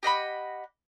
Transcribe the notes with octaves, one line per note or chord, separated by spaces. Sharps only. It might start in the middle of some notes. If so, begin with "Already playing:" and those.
G4 D#5 F#5 B5